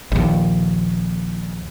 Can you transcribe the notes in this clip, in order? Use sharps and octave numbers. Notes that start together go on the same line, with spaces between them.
A#1 D#2